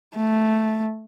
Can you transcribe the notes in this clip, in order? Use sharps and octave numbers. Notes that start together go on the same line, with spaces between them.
A3